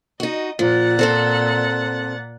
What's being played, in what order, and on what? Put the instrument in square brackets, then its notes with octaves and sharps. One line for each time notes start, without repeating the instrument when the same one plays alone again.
[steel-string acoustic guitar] D#4 F#4 [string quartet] D#5
[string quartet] A#2 F#5 A6 [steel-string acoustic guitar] F3
[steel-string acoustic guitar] C4 A4 C5